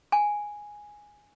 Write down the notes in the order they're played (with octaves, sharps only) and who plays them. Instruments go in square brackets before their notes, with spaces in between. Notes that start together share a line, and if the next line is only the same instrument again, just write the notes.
[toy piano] G#5